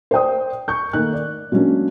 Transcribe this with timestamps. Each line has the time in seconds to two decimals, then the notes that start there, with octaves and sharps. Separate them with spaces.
0.11 C5 D5 G5 D#6
0.68 C#6 G6
0.93 D#3 A3 A#3 F#6
1.13 D5
1.52 F#3 G#3 A#3 C#4 D4